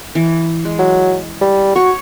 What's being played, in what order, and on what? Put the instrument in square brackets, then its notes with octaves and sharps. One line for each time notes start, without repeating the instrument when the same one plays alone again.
[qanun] E3
G#3
[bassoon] F#3
G3
[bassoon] F#4 [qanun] C#5 C#6